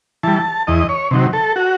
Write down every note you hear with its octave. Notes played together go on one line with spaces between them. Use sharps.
E3 G3 A5
E2 D#5
C#5
C3 D#3 F#3
A4
F#4